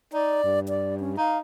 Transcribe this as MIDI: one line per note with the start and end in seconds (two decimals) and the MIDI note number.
0.13 0.43 63
0.13 0.60 74
0.44 1.13 43
0.69 0.95 74
1.00 1.16 61
1.17 1.40 63
1.17 1.38 77